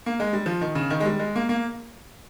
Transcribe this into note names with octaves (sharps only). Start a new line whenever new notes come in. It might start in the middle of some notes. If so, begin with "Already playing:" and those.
A#3
G#3
G3
F3
D#3
C#3
D#3
G#3
G3
G#3
A#3
A#3